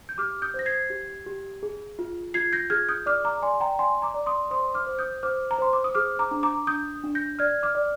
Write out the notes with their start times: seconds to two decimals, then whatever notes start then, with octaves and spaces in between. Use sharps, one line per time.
0.09 G6
0.18 G4 D6 F6
0.42 D#6 G6
0.54 C5
0.59 A#6
0.66 G#6 C7
0.90 G4
1.26 G4
1.63 G#4
1.99 F4
2.34 F4 G#6 C7
2.53 G6 A#6
2.70 G#4 F6 G#6
2.89 D#6 G6
3.06 D5 D6 F6
3.24 A#5 D6
3.42 D5 G#5 C6
3.60 G5 A#5
3.79 D5 G#5 C6
4.02 A#5 D6
4.14 D5
4.26 C6 D#6
4.51 C5 C6 D#6
4.74 D6 F6
4.87 C5
4.99 D#6 G6
5.23 C5 D6 F6
5.51 A#5
5.58 C5 C6
5.73 D6
5.84 D#6
5.95 G#4 D6 F6
6.19 A#5 D6
6.31 D4
6.43 A#5 D6
6.67 D4 D#6 G6
7.04 D4
7.15 G6 A#6
7.39 D5 F6 G#6
7.63 D6 F6
7.75 D5